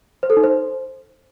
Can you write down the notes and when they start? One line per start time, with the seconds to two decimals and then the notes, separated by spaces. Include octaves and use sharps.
0.23 C5
0.30 A4
0.37 D#4
0.44 C5